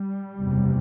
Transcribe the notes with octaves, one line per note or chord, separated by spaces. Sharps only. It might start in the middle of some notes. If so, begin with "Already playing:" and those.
Already playing: G3
F#1 E2 C3